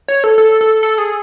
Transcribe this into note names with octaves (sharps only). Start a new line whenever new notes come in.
C#5
A4
A4
A4
A4
G#4